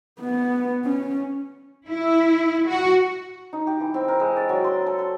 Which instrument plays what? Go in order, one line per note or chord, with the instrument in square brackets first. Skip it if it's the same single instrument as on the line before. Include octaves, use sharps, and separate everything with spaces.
[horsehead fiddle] B3
C#4
[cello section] E4
F#4
[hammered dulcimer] D#4
G4
E3
C4
A#4
G#3
D5
F#3
C6
A4
C6